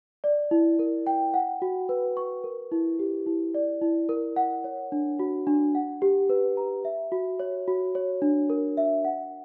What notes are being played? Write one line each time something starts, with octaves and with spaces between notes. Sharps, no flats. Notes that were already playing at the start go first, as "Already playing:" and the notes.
D5
E4
A#4
G5
F#5
F#4
B4
C#6
A#4
E4
G4
E4
D5
E4
A#4
F#5
C#5
D4
F#4
D4
F#5
G4
B4
A#5
E5
F#4
C#5
F#4
C#5
D4
A#4
E5
F#5